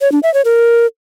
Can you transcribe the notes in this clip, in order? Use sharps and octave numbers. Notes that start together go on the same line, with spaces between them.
C#5
D4
E5
C#5
A#4